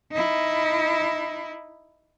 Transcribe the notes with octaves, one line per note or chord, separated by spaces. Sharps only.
D#4 E4